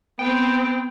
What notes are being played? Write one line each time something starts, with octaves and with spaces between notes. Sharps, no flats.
B3 C4 G5